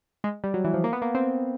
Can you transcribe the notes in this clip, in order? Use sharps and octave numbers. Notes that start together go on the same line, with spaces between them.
G#3
G3
F#3
E3
F3
A#3
B3
A#3
C4